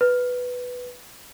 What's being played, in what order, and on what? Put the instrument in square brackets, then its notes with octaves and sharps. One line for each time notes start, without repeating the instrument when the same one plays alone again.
[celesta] B4